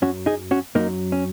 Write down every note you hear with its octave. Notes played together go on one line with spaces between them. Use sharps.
F#2 F#3 C#4 F#4
D#4 G#4
C#4 F#4
F#2 F#3 A#3 D#4
C#4